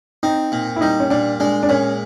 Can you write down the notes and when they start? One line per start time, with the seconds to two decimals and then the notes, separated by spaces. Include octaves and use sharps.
0.23 C4 D#4
0.52 A#2
0.76 E4
0.81 G3 D#4
1.00 C#4
1.10 A#2 D4
1.40 G#3 D4
1.63 D4
1.69 A#2 C#4